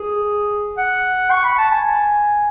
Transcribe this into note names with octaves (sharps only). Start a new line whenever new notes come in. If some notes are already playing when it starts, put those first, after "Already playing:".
Already playing: G#4
F#5
C#6
B5
A5
G#5